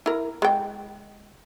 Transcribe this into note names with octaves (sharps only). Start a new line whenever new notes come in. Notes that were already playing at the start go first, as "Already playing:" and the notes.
E4 A#4
G#3 G5